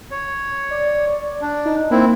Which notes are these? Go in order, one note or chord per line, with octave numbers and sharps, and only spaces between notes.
C#5
D5
D4
D#4
A#3 C4 E4